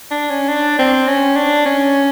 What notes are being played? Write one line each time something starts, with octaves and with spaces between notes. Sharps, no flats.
D4
C#4
D4
C4
C#4
D4
C#4